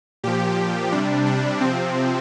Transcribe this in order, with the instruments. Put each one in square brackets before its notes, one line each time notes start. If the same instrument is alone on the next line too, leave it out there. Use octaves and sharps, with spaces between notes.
[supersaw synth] A#2 F3 G4
C3 G3 D4
D4
C3 F3 C4